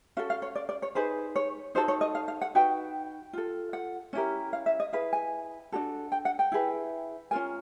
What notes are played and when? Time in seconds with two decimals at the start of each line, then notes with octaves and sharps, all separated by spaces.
0.17 C#4 F#4 A4 F5
0.30 F5
0.42 C#5
0.55 D5
0.69 D5
0.82 C#5
0.95 D#4 G#4 B4 C5
1.36 C#5
1.75 D#4 F#4 A4 C5
1.88 C#5
2.01 D#5
2.15 F5
2.28 F5
2.41 F#5
2.55 D#4 F#4 B4 G5
3.33 F4 A4
3.73 F#5
4.13 C#4 E4 G4 A#4
4.53 F5
4.66 E5
4.80 D#5
4.93 E4 G#4 B4 F5
5.13 G#5
5.72 D4 F#4 A4
6.12 G5
6.25 F#5
6.39 G5
6.52 E4 G#4 B4
7.31 C#4 F4 A#4 G#5